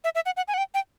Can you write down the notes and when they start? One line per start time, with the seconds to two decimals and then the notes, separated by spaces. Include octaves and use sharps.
0.04 E5
0.15 E5
0.26 F#5
0.37 F#5
0.48 G#5
0.54 F#5
0.58 G5
0.74 G5